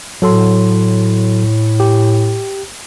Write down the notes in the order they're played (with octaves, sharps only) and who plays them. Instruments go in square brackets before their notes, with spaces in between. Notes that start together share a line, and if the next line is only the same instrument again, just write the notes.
[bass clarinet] A2 [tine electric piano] F#3 A4 C6
[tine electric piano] G4